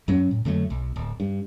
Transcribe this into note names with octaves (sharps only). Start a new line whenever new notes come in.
F#2 F#3 C#4
A2
F2 D3 F#3 A3
B1
D1
G2